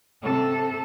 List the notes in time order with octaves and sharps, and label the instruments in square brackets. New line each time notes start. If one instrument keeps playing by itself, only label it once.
[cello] C3 A4